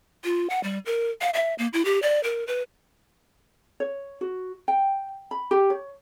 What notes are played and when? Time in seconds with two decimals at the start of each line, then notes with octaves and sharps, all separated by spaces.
0.24 F4
0.50 F#5
0.63 G3
0.86 A#4
1.21 F5
1.34 E5
1.59 A#3
1.73 E4
1.85 G4
2.02 D5
2.24 A#4
2.47 B4
3.80 C#5
4.21 F#4
4.68 G5
5.31 B5
5.51 G4
5.70 C#5